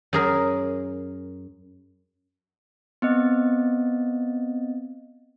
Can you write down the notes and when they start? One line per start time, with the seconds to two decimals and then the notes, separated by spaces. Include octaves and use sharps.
0.13 F#2 G#4 A#4
3.02 B3 C4 D#5